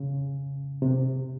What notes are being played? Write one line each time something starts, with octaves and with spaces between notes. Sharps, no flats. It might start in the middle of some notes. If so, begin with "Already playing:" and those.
Already playing: C#3
C3